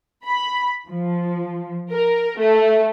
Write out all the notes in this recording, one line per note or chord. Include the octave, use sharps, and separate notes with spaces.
B5
F3
A#4
A3